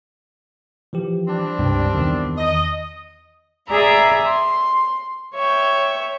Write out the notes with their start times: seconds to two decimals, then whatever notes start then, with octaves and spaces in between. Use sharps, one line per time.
0.93 E3 F3 G4
1.27 G3 C4 D4
1.59 C#2 G2 C3
1.94 E2 D#3
2.38 D#5
3.68 G#4 D5 E5 A#5 B5
4.25 C6
5.34 C#5 E5 G5